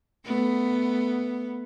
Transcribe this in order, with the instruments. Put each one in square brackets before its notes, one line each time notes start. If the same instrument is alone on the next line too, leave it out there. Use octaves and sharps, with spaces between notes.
[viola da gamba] A3 B3